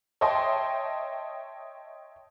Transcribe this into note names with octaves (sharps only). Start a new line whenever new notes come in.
C#5 D#5 E5 G5 A5 C6